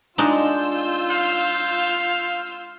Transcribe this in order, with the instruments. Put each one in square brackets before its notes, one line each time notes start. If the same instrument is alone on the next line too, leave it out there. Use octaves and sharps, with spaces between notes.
[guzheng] G#3 D4 D#4 [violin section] F4 E6 G6
[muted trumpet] F5